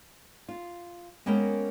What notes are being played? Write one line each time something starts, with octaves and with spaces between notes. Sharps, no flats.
F4
G#3 A#3 B3 C#4 A#4 G5